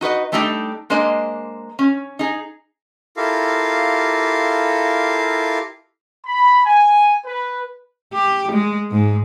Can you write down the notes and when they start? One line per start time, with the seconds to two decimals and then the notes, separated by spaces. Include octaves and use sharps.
0.01 D#4 F#4 B4 D#5
0.32 G3 A3 D4 D#4 F#4 G4
0.90 G#3 A#3 D4 C5 D#5
1.79 C#4
2.19 D#4 G#4
3.17 E4 F4 G4 A4 A#4 F5
6.25 B5
6.65 G#5
7.25 B4
8.13 G4
8.52 G#3
8.91 G#2